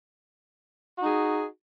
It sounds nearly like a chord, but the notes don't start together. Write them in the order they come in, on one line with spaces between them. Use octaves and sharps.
F#4 D#4 G#4